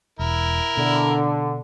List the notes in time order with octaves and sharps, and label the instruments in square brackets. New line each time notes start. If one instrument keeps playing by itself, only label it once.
[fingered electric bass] E1 [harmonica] E4 A#4
[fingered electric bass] B2 [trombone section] D3